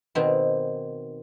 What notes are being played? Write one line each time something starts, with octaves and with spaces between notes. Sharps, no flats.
B2 D#3 C4